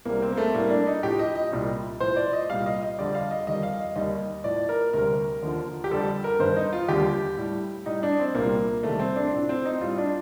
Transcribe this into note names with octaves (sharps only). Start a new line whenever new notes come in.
C2 C3 G3 A#3
C4
A#3
A3
A2 G3 A#3
D4
D#4
A2 F3 G4
D#5
D#5
C2 A#2 G3
A2 F3 C5
D5
D#5
C2 A#2 G3 F5
D#5
D#5
F2 D3 G3 D5
F5
D#5
F2 D#3 G3 D#5
F5
D#5
D#2 D#3 G3 D#5
A2 F3 D5
A#4
D2 C3 G3 A#4
D#2 D3 F3
G4
F2 D3 G3 A4
A#4
G2 D#3 G3 C5
D#4
F4
D#2 D3 G3 G4
A2 G3
A2 G3 D#4
D4
C4
C2 A#2 G3 A#3
C2 C3 D#3 G3 A3
C4
D4
A2 F3 D4
C4
D#4
A2 G3 F4
D4